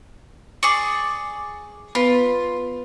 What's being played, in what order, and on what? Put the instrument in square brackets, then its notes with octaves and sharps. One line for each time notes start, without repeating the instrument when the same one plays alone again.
[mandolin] G#4 D5 C#6
[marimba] B3 B4 [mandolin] F4